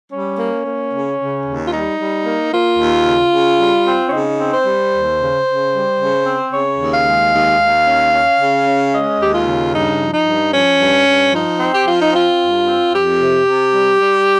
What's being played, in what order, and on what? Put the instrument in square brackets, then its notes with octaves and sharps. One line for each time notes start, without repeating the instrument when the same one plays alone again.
[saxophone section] G3 C#4
A#3
A#3
C#3
C#3
D#2
F4
G3 D#4
G3
A#3
A#3 F4
D#2
C#3
C#3
G3
C4
C#4
C#3 D#4
C4
C5
G3
D#2
C#3
C#3
G3
C#3
C4
C#3 C#5
D#2
F5
G#3
D#2
D#2
C#4
C#4
C#3
C#4
G#3 D#5
D#2 G4
F4
C#3
G2 D#4
F3
D#4
G2
F3 C#4
G2
G2
F3 D#4
C4
G4
F3 F4
D#4
C4 F4
G2
C4
F2 G4
C3
C3
G3
G3